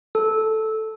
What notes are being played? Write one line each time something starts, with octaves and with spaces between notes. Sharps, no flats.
A4